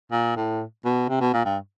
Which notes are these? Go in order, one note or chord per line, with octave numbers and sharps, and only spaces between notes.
A#2
A2
B2
C3
B2
A#2
G2